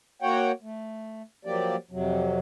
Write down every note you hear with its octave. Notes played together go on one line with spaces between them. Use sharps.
A#3 F#4 C#5 F#5 G5
A3
F3 F#3 A#3 G4 D5
F2 C3 F#3